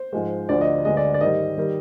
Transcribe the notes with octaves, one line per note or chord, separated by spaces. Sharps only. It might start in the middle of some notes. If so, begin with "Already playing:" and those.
Already playing: C5
G#2 F3 G#3
D2 D3 F3 D5
D#5
D2 D3 G#3 D#5
D5
D5
G#2 D#3 G3 D#5
D#3 G3